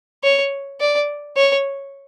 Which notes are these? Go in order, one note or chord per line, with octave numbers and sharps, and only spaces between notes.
C#5
D5
C#5